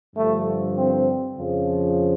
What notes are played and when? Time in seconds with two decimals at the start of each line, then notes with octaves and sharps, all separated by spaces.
0.15 G2 D3 F3 A3
0.76 C4
1.37 F2 C#3 F3